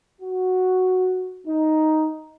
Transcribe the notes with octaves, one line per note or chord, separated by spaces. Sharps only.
F#4
D#4